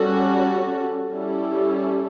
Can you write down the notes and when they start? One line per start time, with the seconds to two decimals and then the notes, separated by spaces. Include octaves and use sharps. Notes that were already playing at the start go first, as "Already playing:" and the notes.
Already playing: G3 C#4 F#4 A4
1.09 G3 C#4 E4 A4